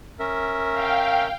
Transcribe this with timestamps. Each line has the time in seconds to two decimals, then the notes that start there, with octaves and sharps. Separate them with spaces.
0.19 C#4 A#4 E5
0.72 F5 G5